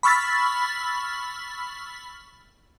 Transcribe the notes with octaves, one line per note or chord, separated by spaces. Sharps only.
B5 C#6 E6 F6 A6 B6